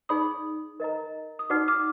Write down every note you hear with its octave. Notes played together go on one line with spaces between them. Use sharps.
D#4 G#4 D5 B5 D#6
A#4 D#5 A#5
D#6
D#4 F#4 D5 F#5 D6 F6
D6 F6